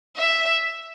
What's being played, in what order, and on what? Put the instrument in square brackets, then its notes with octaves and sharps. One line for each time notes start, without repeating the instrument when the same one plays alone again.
[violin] E5